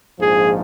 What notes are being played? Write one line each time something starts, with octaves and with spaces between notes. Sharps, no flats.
A#1 G#2 F3 G#4